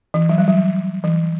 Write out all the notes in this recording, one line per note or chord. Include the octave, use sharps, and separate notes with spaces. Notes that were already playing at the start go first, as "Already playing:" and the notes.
E3
F#3
G3
F#3
E3